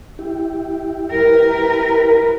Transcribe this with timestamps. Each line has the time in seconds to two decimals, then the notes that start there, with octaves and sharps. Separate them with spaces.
0.19 E4 G4
1.11 A#4 B4